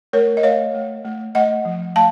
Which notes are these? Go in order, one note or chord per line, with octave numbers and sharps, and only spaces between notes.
A3 A#4 C#5
D#5
A3 C#5 F5
A3
A3
A3 D#5 F#5
F3
A3 F5 A5